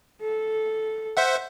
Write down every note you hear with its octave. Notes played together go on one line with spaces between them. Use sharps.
A4
C5 E5 F#5